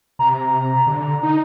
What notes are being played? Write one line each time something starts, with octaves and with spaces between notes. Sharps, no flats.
C3 A#5
D3
D#4